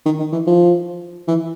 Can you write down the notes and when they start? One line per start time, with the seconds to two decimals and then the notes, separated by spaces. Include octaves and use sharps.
0.06 D#3
0.20 D#3
0.33 E3
0.47 F3
1.28 E3